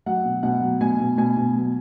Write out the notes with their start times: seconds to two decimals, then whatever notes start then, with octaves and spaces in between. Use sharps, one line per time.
0.06 F#3 F#5
0.25 B2
0.43 B2 F#5
0.61 F#3
0.81 B2 G#5
1.00 B2
1.18 B2 G#5
1.37 B2
1.55 F#3